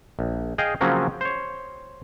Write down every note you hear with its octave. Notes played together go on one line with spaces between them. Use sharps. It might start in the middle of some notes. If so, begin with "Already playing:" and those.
A#1
G#4 D#5 F5 G5
C#3 F3 F#3 A#3 C4 C#4
C5 C#5